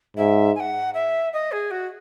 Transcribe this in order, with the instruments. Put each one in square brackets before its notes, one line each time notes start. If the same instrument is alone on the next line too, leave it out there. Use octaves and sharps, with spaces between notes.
[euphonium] G#2 [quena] E5
[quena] G#5
F#5
E5
D#5
G#4
F#4